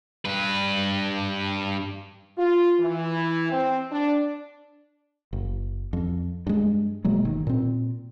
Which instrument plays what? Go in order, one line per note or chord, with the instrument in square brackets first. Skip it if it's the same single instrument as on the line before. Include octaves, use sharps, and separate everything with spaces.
[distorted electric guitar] G2 B4
[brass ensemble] F4
E3
C4
D4
[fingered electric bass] F#1
F2
G2 G#3
B2 F#3 G#3 A#3
G1 D#3
A#2 C4